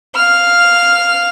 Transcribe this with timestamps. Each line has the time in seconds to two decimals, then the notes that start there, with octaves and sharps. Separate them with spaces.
0.16 F5 F6